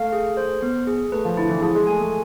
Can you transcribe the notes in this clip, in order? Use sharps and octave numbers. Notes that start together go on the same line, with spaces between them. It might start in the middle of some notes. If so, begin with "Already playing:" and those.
Already playing: A3 F5
G#4
C5
B3
G#4
A3 B4
F3
D3 E4
E3
F3 G#4
G#3
A3 G#5
A3